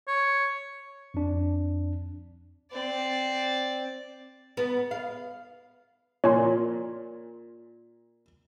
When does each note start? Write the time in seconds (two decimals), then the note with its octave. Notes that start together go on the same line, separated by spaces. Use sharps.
0.07 C#5
1.14 F2 D4
2.71 C4 D5
4.57 B3
4.91 F5
6.24 A#2 A#4 C#5 G#5 C6